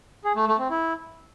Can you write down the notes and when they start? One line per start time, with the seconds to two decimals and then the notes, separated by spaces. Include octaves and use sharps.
0.24 G#4
0.36 A3
0.47 A3
0.59 C4
0.70 E4